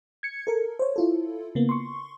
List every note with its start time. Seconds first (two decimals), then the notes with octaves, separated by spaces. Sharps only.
0.23 G#6 C#7
0.47 A4 A#4
0.79 C5 C#5
0.96 E4 F4 A4
1.55 C#3 A#3 B3
1.69 C6 C#6